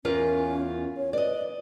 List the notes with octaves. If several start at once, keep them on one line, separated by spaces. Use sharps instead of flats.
E2 C#4 F4 A#4
C#5
B4 D5 D#5